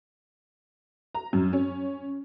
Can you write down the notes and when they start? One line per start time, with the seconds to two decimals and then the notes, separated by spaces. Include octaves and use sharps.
1.15 A#5
1.33 F#2
1.53 C#4